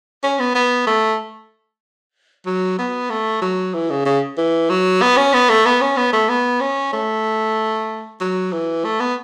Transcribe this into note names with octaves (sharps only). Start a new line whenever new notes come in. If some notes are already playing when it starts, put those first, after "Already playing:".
C#4
B3
B3
A3
F#3
B3
A3
F#3
E3
C#3
C#3
E3
F#3
B3
C#4
B3
A3
B3
C#4
B3
A3
B3
C#4
A3
F#3
E3
A3
B3